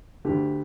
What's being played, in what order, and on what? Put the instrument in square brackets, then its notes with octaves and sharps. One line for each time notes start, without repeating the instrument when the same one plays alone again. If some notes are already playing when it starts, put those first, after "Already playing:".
[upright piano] D2 D3 G4